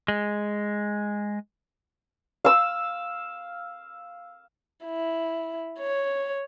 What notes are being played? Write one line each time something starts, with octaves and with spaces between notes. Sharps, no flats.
G#3
F5 E6
E4
C#5